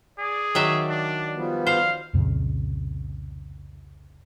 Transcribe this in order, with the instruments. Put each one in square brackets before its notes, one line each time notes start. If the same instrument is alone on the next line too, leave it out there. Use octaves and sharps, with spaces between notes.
[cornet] G#4 [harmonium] D5
[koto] D#3 F#3 E5
[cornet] D4
[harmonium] F3 G3 B3
[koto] C5 [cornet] F5
[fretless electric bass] C2 F2 A#2 C#3